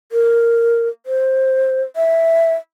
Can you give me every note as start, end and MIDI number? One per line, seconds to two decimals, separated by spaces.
0.12 0.88 70
1.06 1.82 72
1.96 2.55 76